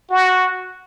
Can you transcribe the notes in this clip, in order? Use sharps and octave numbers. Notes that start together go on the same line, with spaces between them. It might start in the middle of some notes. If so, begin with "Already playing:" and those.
F#4